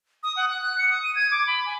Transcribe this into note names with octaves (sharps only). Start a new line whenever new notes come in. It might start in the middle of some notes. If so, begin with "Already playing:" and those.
D#6
F#5
F#6
F#6
C#7
D#6
D#7
G#6
D6
B5
G#5